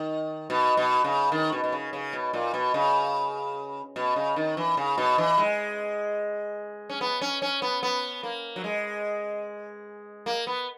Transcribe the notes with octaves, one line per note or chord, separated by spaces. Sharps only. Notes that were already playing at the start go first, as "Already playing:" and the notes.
Already playing: D#3
B2
B2
C#3
D#3
B2
B2
C#3
C#3
B2
A#2
B2
C#3
B2
C#3
D#3
E3
C#3
B2
E3
G#3
C#4
B3
C#4
C#4
B3
B3
A#3
F#3
G#3
A#3
B3